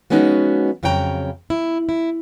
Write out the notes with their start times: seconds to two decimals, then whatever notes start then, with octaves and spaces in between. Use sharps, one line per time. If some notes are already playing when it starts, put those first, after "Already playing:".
0.10 F3 G#3 B3 C#4 D#4 F#4
0.83 F2 C#3 F#3 C#5 G5 A#5
1.50 E4
1.89 E4